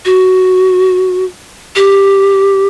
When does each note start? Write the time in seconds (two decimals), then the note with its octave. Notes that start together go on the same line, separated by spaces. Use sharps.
0.05 F#4
1.76 G4